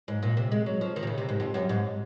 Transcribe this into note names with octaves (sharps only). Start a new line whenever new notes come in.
G#2
A#2
C3
G#3
F#3
F3
D#3
C3
C#3
C3
G#2
F2
F#2
G#2